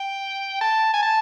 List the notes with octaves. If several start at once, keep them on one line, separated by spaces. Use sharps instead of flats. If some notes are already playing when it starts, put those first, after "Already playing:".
Already playing: G5
A5
G#5
A5